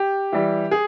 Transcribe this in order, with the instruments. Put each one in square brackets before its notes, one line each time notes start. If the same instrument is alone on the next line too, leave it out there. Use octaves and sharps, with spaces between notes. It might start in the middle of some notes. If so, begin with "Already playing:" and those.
Already playing: [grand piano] G4
E3 G3
G#4